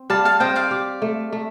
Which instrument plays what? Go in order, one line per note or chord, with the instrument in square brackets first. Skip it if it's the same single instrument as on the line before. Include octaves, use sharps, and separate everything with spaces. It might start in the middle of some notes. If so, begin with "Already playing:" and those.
Already playing: [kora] C4
[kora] G3 [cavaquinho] F5 A5
[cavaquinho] F5 A5
[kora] C4 [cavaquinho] D#5 G5
[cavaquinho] D5 F5
[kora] G4
A3
A3